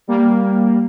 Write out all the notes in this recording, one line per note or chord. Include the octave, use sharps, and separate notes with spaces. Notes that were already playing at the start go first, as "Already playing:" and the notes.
G3 A#3